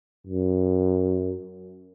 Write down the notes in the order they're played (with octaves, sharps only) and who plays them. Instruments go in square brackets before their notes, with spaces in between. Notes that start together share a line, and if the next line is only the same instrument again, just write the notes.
[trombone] F#2